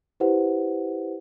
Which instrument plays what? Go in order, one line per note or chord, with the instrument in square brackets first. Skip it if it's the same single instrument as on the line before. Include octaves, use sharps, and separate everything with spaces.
[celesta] E4 G4 B4 C5 F#5